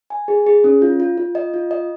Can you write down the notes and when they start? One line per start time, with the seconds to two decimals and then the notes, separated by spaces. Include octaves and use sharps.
0.10 G#5
0.28 G#4
0.47 G#4
0.64 C#4
0.82 F4
1.00 F4
1.18 F4
1.35 D#5
1.54 F4
1.71 D#5